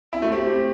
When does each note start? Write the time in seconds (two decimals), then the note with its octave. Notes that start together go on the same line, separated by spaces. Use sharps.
0.13 C4 E4
0.22 A3 F#4
0.32 C4 G4